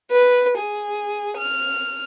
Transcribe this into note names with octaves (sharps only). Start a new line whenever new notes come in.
B4
G#4
F6